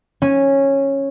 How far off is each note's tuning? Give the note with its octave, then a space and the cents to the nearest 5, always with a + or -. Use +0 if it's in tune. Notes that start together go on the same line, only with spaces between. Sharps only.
C#4 -10